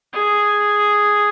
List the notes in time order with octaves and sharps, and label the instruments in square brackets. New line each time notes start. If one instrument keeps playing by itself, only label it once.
[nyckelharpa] G#4